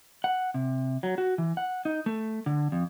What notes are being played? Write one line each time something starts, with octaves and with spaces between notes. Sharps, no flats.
F#5
C3
F#3
F#4
E3
F#5
D#4
A3
D3
F2